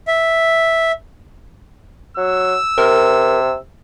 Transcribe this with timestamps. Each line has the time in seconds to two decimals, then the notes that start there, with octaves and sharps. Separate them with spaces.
0.08 E5
2.17 F#3 E6
2.78 C3 A#4